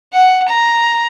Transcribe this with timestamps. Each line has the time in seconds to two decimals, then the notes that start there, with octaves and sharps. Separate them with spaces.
0.13 F#5
0.48 A#5